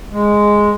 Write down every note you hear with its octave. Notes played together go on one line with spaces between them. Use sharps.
G#3